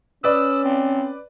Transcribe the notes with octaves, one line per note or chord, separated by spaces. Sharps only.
C#4 B4 D5 E6
C4